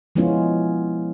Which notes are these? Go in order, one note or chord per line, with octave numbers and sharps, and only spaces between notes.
F3 G#3 B3 C#4 E4 F4